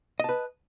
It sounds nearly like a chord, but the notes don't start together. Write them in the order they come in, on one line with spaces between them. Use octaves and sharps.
D#5 A5 B4